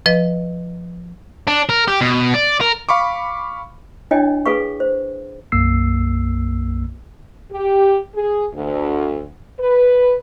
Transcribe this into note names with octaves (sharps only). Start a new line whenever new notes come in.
F3 B4 D#5
D4
A#4
G4
B2
D5
A#4
F5 B5 C#6 D6
D4 E4 C#5 D#5 G5 G#5
G#4 A4 B4 F5 C#6
C5
B1 F#2 A#3 E6 C7
G4
G#4
D2
B4